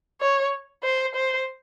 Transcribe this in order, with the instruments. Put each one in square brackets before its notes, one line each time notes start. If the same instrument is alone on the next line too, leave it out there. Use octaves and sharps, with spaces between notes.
[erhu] C#5
C5
C5